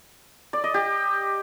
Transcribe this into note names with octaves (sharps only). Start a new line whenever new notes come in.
D5
D#5
G4